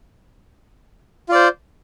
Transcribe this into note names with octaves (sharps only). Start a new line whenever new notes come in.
F4 C5 D5